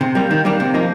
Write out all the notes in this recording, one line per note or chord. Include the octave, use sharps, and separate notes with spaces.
C3
G3 A#3
D#3
G3 A#3 D4
C3
F3 A#3 D#4